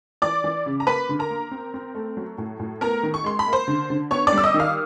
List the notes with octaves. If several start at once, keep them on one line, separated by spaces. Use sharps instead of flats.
E3 D5 D6
E3
C#3
A#5
A#3 B4 B5
D3
A#4 A#5
A#3
C4
C4
A3
F#3
A2
A2
B3 A#4 A#5
D#3
C#6
G#3 C6
B5
A#3
C5 C6
D3
D3
B3 C#5 C#6
D5 D6
G3
E6
D#5 D#6
D#3
F5 F6